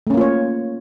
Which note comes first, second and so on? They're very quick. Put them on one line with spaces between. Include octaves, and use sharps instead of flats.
A3 C#4 A#3 F4 C#5